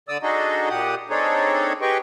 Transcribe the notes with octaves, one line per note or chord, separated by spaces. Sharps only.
D3 D5 D#6 E6
D4 D#4 F#4 G#4 A4 D#5
A#2 G4 F#5 D#6
C4 D4 D#4 G#4 A4 C#5
G4 G#4 B4 D#5 G5 C#6